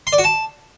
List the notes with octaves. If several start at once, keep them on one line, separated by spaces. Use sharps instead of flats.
C6
D5
F#4
A5